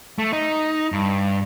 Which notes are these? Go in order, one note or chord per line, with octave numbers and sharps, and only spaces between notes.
A3
D#4
G2